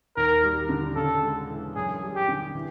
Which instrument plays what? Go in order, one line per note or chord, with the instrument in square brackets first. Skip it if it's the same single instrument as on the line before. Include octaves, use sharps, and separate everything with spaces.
[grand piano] D#2 [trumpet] A#4
[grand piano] G3
D3
[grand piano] C#3 [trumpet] A4
[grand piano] G#3
E3
[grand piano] F#2 [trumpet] G#4
[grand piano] G3
[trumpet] G4
[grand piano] D3
E3